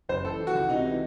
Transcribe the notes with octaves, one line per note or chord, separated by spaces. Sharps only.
F#1 C5
E3 A4
E3
F#4
C#2
C3 D#4
E3